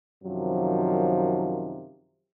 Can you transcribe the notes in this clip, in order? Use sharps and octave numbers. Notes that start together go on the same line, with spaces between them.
F#2 C3 D#3 F3 F#3